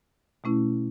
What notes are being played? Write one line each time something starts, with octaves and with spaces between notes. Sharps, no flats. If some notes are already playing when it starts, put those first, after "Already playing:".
B2 A3 C#4 E4